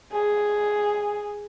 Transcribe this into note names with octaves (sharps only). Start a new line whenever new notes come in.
G#4